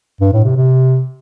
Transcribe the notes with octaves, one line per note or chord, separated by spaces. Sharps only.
G2
A2
C3
C3